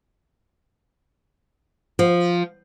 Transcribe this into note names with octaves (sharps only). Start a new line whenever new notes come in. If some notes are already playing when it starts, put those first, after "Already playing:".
F3